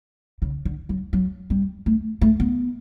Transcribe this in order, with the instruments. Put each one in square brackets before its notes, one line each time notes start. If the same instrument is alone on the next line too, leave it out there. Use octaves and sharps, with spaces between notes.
[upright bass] C#3
D3
F#3
F#3
G3
A3
A3
B3